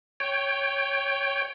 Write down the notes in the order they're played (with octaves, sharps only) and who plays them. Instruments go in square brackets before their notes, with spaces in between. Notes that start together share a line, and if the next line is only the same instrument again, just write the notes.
[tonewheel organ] C#5 G5